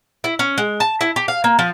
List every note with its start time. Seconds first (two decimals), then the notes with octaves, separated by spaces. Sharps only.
0.24 E4
0.39 C#4
0.58 G#3
0.80 A5
1.01 E4
1.16 G4
1.28 F5
1.44 A#3
1.59 F3